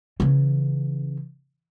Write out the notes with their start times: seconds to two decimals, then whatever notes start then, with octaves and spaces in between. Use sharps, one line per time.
0.20 C#3 E3